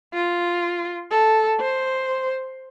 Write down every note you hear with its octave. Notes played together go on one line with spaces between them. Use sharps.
F4
A4
C5